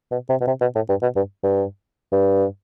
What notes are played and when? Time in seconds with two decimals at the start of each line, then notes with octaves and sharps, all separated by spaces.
0.11 B2
0.29 C3
0.41 B2
0.47 C3
0.61 B2
0.75 A2
0.89 G2
1.02 B2
1.16 G2
1.43 G2
2.12 G2